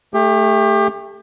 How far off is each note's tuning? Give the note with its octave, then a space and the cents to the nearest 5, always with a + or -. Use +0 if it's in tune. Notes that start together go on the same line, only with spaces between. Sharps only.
A3 +0 G4 +30